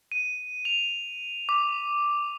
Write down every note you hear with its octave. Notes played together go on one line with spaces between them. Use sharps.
D#7
F7
D6